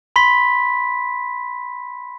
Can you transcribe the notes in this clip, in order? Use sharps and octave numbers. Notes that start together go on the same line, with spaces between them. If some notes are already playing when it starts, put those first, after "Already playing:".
B5 C6 B6